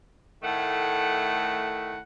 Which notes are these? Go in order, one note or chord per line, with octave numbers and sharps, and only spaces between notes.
A2 D#3 A3 F#5